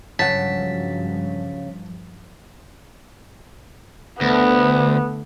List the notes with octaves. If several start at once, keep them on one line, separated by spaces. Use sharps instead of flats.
G2 C#3 F3 F#3 F#5 A5 B6
D2 D3 A3 B3